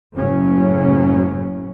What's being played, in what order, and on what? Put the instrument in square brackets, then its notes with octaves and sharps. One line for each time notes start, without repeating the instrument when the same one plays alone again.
[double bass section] F#1 A2 C#3 F#3 C#4